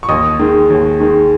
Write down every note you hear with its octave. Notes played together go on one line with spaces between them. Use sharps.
C#6
D#2 D#5 D#6
D#3 G#3
D#2
D#3 G#3